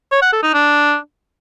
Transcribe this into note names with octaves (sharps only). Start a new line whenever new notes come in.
C#5
F#5
A4
D#4
D4